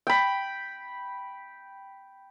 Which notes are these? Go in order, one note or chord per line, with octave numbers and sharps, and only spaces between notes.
G5 B5